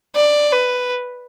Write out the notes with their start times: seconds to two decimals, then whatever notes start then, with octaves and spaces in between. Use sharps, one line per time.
0.15 D5
0.52 B4